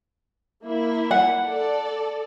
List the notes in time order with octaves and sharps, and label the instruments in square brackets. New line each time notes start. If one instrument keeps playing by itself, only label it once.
[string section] A#3 E4
[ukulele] F#5
[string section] A4 D5